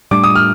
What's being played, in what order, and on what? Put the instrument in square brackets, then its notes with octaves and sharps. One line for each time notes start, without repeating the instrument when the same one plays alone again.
[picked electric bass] A2 G3 D4 [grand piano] D6
[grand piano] D#6
F6